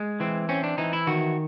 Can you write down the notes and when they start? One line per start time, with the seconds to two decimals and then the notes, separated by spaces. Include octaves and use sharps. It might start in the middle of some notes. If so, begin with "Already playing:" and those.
Already playing: G#3
0.20 E3 C4
0.49 C4 C#4
0.64 D4
0.78 E3 D#4
0.93 E4
1.07 D#3 F#4